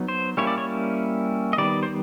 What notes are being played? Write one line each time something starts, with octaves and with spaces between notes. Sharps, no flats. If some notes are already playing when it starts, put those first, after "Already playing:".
Already playing: F#3 B3 D#4
C5
G3 A#3 C#4 E4 C#5
D5
C#5
D#5
D#3 G3 B3 D5
C5